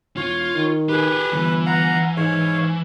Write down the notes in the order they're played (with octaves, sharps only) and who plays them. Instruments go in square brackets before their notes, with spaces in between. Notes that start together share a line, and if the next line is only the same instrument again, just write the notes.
[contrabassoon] E1 [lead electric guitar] F4 [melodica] C#5
[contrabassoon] D#3
[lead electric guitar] G4 G#4 [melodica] B4
[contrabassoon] G1 [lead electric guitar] E3
[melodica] F5 F#5 A#5
[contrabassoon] G#2 [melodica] C#5 F5